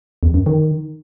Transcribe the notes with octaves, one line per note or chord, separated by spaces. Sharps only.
E2
F#2
D#3